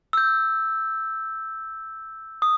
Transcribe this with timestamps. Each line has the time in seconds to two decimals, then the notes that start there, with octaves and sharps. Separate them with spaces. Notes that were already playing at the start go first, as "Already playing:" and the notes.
0.13 E6 G6
2.42 D#6